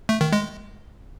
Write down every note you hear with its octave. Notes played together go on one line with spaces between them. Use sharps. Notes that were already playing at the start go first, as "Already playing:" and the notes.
A3
D#3
G#3